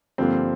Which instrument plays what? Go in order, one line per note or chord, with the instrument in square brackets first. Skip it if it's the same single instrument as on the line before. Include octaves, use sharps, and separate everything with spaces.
[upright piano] G2 D3 F3 A#3 C4